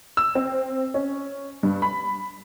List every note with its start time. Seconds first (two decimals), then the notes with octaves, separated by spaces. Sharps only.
0.17 E6
0.35 C4
0.94 C#4
1.63 G2
1.82 B5